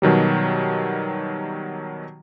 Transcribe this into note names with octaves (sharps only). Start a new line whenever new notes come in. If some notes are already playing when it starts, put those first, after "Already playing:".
B2 D#3 F#3 G3